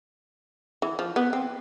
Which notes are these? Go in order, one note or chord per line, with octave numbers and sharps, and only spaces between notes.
E3
F3
B3
C4